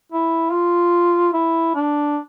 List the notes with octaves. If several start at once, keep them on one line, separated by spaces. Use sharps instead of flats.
E4
F4
E4
D4